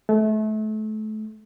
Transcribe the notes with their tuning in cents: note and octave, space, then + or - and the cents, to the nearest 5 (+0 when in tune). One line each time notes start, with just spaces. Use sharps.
A3 -30